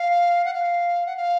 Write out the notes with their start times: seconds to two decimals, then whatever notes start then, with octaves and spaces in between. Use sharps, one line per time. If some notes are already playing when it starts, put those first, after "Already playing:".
Already playing: F5
0.45 F#5
0.54 F5
1.06 F#5
1.17 F5